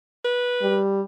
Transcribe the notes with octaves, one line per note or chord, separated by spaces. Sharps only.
B4
G3